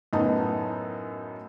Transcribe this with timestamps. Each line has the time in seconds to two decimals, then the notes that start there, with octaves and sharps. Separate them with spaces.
0.13 F#2 A2 B3 D#4 A5